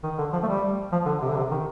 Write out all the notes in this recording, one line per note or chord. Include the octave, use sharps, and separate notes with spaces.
D#3
D3
F3
A3
G3
F3
D3
C3
D3
C3
D#3